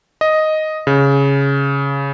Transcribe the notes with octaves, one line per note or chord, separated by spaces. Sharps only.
D#5
C#3